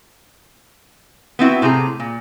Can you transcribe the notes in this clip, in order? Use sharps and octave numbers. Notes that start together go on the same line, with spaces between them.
B3 C4 E4 F#4
A2 C3 G#4 A#5
A#2